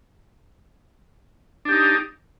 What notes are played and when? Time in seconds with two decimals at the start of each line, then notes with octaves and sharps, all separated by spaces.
1.65 D4
1.69 G4
1.72 D#4